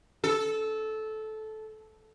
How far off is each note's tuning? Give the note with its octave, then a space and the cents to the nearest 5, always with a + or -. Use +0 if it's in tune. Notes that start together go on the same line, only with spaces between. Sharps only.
A4 -15